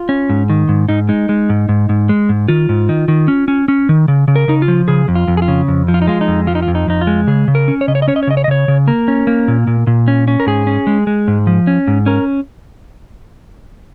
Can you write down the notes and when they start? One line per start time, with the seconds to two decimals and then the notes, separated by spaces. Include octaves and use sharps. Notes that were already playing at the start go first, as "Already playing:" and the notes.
Already playing: F4
0.09 C#4
0.29 G#2
0.50 D#3
0.69 G#2
0.89 G#2 D#4
1.09 G#3 D#4
1.29 G#3
1.49 G#2
1.69 G#2
1.89 G#2
2.09 G#3
2.29 G#2
2.48 D#3 F4
2.69 G#2
2.89 D#3
3.08 D#3
3.28 C#4
3.48 C#4
3.68 C#4
3.89 D#3
4.08 C#3
4.28 C#3
4.36 A#4
4.48 C#3 D#4
4.62 F4
4.68 F3
4.88 C#3 G#4
5.08 F2
5.15 F4
5.28 F2
5.37 G#4
5.42 F4
5.48 C#3
5.68 F2
5.88 F3
5.94 F4
6.02 D#4
6.07 G#3 F4
6.21 D#4
6.28 F2
6.47 F3 F4
6.55 D#4
6.62 F4
6.68 F2
6.75 D#4
6.88 F2 D#4
7.01 F4
7.07 G#3
7.27 C#3 G#4
7.48 C#3
7.55 A#4
7.68 C#4
7.81 C#5
7.88 C#3 D#5
7.95 C#5
8.02 D#5
8.08 C#4 C#5
8.16 D#5
8.23 C#5
8.27 C#3 D#5
8.37 C#5
8.44 D#5
8.48 C#3 C#5
8.68 C#3
8.88 A#3 A#4
9.08 C#4
9.27 A#3
9.48 A#2
9.67 A#2
9.87 A#2
10.08 C#4
10.28 C#4
10.40 A#4
10.47 G#2 G#4
10.67 C#4
10.87 G#3
11.07 G#3
11.28 G#2
11.47 F3
11.67 C#4
11.87 G#2
12.06 C#4 A#4